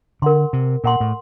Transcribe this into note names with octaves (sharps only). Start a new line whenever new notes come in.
D3 A#4 F#5 C6
C3
A#2 A#4 F#5 C6
A2